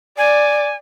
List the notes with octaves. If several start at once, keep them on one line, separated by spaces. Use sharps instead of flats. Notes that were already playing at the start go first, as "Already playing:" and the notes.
D5 G#5